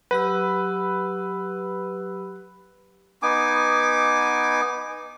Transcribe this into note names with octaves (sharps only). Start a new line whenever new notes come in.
F#3 G4 B4 E6
B3 D#4 G#5 D6